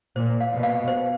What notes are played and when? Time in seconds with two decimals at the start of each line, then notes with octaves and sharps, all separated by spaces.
0.16 A#2 C5
0.40 F5
0.51 B2
0.63 F5
0.88 C5